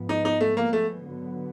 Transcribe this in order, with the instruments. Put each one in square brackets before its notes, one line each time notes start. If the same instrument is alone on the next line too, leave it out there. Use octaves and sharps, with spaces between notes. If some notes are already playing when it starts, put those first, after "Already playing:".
Already playing: [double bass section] G#2 F3 G#3 B3
[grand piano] D#4
D#4
A3
A#3
A3
[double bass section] D3 F#3 B3